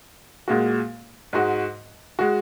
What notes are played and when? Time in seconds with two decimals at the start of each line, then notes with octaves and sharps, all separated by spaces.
0.48 A#2 G#3 F#4
1.33 G#2 G#3 F#4
2.19 G#3 F#4